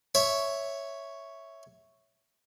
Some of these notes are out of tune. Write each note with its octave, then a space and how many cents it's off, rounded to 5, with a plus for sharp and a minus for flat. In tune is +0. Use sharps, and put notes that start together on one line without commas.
C#5 +0 E5 +0 B5 +0